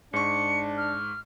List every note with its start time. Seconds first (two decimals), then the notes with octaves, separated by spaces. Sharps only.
0.13 G#2 D4 C#6 C#7
0.77 F6